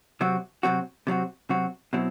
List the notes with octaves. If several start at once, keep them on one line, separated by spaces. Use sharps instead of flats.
C3 F#3 C4 F#4
C3 F#3 C4 F#4
C3 F#3 C4 F#4
C3 F#3 C4 F#4
B2 F#3 C4 E4